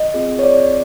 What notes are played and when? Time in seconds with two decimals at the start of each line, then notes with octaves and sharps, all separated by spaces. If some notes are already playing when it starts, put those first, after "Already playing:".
Already playing: D#5
0.14 C4 F4 G#4
0.39 C#5
0.44 D5